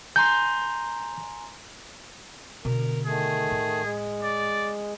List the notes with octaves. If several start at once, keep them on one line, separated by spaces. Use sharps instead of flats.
G#5 A#5 C6 G6
B2 D3 A#4
D#3 A3 G#4
A2
G#3
D5